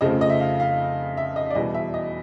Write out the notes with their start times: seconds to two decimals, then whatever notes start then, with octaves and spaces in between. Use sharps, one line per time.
0.01 F2 C#3 F3 A3 C4 D#5
0.21 D#5
0.30 E5
0.40 F5
0.60 F5
1.17 E5
1.36 D#5
1.51 D5
1.55 E2 B2 G3 D#5
1.74 E5
1.94 D#5